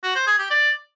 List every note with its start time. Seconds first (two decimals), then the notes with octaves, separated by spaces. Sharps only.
0.04 F#4
0.15 C5
0.27 G#4
0.39 G4
0.51 D5